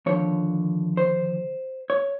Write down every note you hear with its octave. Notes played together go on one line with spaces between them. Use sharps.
D#2 D3 F3 C#5
C5
C#5